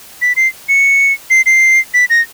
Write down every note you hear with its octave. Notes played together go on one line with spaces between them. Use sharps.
B6
C7
C#7
C7
C7
B6
A#6